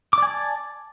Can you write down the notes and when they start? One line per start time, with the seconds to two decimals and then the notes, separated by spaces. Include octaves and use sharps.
0.13 D6
0.18 D5
0.22 G#5
0.27 A5